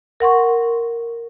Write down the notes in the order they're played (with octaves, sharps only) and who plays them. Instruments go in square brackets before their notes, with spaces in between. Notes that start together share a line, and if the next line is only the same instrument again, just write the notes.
[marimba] A#4 F#5 C6 C#6